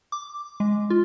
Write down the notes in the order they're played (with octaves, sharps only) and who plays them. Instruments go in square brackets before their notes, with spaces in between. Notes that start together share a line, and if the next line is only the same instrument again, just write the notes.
[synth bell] D6
G#3
F4